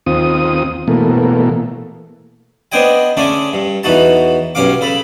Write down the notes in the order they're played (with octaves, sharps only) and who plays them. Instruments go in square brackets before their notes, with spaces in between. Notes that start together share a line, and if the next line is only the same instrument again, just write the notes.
[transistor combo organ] D#2 C4 F4 D#6
B2 E3 A3 A#3
[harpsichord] B3 D4 C5 D#5 G5 G#5
D3 A3 C#4 D4 G#4 D5
G2
E2 E3 D#4 F#4 A5
B1 G2 C#4 F5 D6
C#3 A4 B5